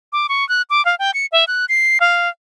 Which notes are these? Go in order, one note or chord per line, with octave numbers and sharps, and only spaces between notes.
D6
C#6
F#6
D6
F5
G5
C#7
E5
F#6
C7
F5